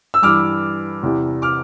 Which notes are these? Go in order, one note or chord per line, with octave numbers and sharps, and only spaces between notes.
E6
G2 E3 D6 F6
E2 C3 E3
D6 F6